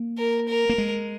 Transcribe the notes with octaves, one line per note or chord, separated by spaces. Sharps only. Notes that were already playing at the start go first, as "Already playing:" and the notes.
Already playing: A#3
A#4
A#4
A#3
G#3